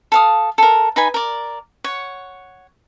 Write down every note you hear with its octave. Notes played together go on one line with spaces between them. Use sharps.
A4 F5 D#6
A4 A#4
D#4 B4 G#5 B5
A#4 D5
C#5 F#5